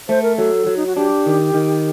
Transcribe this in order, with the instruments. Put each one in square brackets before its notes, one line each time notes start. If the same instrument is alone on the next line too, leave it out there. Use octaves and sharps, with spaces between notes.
[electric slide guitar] A3 [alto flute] C5
[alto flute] A#4
[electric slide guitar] F#3 [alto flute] A4
[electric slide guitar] F#3
[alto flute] D#4
F#4
[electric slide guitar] D4 [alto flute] G4
[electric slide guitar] D#3
D#3